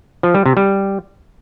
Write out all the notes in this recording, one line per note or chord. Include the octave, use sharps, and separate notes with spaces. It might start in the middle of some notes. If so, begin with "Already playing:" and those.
F3
G3
C3
G3